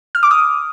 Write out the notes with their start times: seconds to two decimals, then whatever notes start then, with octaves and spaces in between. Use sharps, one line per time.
0.15 F6
0.23 D6
0.31 D#6